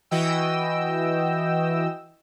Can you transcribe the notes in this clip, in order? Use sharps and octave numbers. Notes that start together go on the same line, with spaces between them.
E3 F#4 D#5 G5 E6